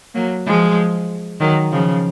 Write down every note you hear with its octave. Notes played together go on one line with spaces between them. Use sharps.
F#3 A#3
F3 G#3
D#3 F#3
C#3 F3